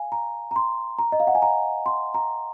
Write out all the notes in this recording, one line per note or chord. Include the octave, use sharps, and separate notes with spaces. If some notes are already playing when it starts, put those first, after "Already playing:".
Already playing: F5 G#5
A#5
A#5
C6
A#5
D#5
F5
F#5
G#5
A#5
C6
A#5